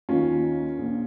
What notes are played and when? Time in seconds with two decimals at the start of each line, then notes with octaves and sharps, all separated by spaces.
0.09 D#2 D#3 C#4 F4
0.79 A#1 A#2